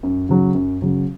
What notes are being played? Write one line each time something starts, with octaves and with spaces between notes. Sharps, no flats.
F#2
C#3 F#3
F#2
C#3 F#3